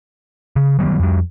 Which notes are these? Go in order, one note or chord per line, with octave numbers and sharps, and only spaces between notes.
C#3
D#3 F#3 G3 B3
F2 G3